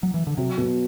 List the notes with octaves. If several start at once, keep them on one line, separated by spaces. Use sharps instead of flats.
F#3
E3
D3
C3 F#3
B2